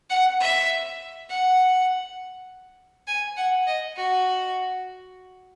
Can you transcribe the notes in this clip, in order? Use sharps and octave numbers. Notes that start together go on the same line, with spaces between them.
F#5
E5
F#5
G#5
F#5
D#5
F#4